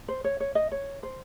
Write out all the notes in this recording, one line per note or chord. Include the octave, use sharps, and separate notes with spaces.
C5
C#5
C#5
D#5
C#5
C5